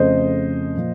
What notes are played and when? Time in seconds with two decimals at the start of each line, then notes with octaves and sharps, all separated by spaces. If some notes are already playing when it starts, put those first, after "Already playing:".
Already playing: F2 C#3 A3 C5 D#5
0.76 A#2 F3